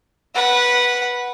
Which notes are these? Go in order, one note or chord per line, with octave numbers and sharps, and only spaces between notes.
B4 F#5